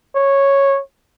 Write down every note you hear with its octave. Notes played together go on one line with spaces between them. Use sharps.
C#5